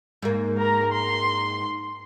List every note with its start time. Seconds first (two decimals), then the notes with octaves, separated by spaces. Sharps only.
0.22 G#2 A#3
0.58 A#4 A#5
0.92 C6